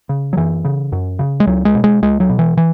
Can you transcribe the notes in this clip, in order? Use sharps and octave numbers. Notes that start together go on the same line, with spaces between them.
C#3
F#3
F#2 E3
C#3
F#2
C#3
G#3
C#2 F#3
G#3
B2
G#3
C#2 G#3
F#3
B2
E3
E3